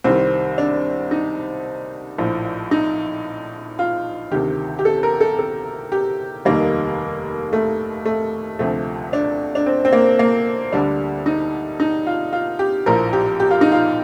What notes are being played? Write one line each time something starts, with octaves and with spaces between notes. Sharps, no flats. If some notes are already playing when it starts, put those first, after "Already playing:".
C2 C3 D#3 G3 C4
D4
D#4
A#1 A2 F3
D#4
F4
D2 C3 D#3 G4
G4
A4
A#4
A4
A4
G4
F1 D#2 D#3 G3 A#3
A3
A3
D2 C3 F3 A3
D4
D4
C4
C4
A#3
A#3
D2 D3 G3 D4
D#4
D#4
F4
F4
G4
A#1 A2 F3 A#4
G4
G4
F4
D#4
F4